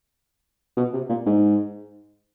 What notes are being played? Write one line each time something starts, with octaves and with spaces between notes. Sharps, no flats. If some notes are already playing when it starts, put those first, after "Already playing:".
B2
C3
A#2
G#2